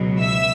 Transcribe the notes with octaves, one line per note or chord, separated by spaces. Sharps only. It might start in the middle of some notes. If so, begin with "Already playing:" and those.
Already playing: C#2 B2 F#3
E5 E6